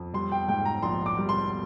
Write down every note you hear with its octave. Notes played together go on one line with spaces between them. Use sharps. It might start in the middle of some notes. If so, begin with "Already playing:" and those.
Already playing: F2
G3 C6
G5
G#2 G5
A#5
A#1 C6
D6
G3
C6